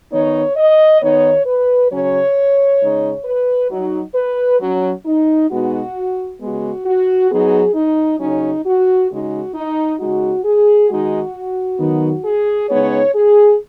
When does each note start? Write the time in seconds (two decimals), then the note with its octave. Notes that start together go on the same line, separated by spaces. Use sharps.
0.11 D#3 B3 D#4 C#5
0.56 D#5
1.00 D#3 B3 D#4 C#5
1.46 B4
1.91 C#3 F#3 C#4 C#5
2.80 C#3 G#3 D#4
3.25 B4
3.71 F#3 D#4
4.15 B4
4.61 F#3 C#4
5.06 D#4
5.50 B2 G#3 B3 D#4 F#4
6.40 C#3 G#3 B3 F#4
6.86 F#4
7.31 F#3 B3 D#4 G#4
7.75 D#4
8.20 C#3 F#3 C#4 D#4
8.65 F#4
9.10 C#3 G#3 D#4 F#4
9.55 D#4
9.99 C#3 G#3 D#4 F#4
10.44 G#4
10.89 D#3 G#3 D#4 F#4
11.79 D#3 F#3 B3 D#4
12.24 G#4
12.69 C#3 G#3 B3 D#4 C#5
13.15 G#4